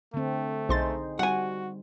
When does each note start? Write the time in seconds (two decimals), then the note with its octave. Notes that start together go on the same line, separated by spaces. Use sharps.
0.14 D3 A3 C4
0.69 B1 D#4 G#4 C5 C6 A6
1.19 G3 F#4 F#5 G#5